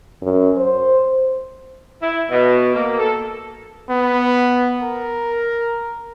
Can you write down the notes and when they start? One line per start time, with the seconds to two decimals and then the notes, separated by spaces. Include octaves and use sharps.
0.22 F#2
0.57 C5
2.02 E4
2.31 B2
2.75 A#3
2.98 A4
3.90 B3
4.82 A#4